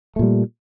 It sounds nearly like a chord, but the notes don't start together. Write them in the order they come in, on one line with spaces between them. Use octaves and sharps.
A3 A#2 G3